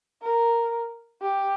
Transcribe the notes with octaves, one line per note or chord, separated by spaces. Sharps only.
A#4
G4